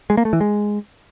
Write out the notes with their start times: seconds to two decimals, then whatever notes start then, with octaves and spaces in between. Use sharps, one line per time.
0.10 G#3
0.17 A#3
0.25 A3
0.33 E3
0.41 G#3